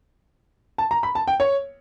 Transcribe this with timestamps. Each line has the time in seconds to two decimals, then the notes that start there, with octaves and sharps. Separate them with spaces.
0.78 A5
0.91 A#5
1.03 B5
1.15 A5
1.28 G5
1.40 C#5